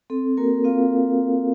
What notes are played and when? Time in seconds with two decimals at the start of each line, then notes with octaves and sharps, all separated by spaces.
0.10 C4 A4
0.37 A#3 F#4 A#4
0.64 C4 F4 F5